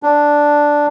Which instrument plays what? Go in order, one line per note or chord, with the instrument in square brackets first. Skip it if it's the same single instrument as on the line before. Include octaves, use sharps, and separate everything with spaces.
[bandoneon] D4